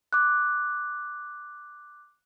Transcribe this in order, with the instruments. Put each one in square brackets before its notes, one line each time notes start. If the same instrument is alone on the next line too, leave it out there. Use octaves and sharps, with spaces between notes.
[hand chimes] D6 F#6